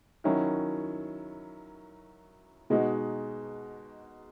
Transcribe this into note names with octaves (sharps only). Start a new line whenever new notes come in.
D#3 F#3 C#4 E4
B2 G#3 D#4 F#4